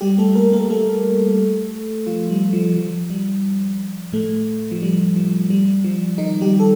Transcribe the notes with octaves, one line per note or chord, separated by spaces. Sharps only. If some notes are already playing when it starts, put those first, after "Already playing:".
G3 G4
A3 A4
A#3 A#4
A#3 A#4
A3 A4
F3 F4
G3
F3
F3
G3
A2 A3
F3
G3
F3
G3
F3
D#3 D#4
G3 G4
A4